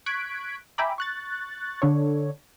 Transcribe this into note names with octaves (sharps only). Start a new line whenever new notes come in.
C#6 F#6 G#6 B6 D7
E5 G5 G#5 A#5 B5 D6
C#6 F#6 A6
D3 D4 A4 C#5